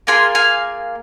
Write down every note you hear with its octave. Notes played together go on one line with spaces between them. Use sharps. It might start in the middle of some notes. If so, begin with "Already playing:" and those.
A#3 F4 G#4 G#5 C6
F5 G#5